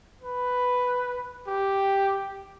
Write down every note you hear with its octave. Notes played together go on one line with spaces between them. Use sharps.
B4
G4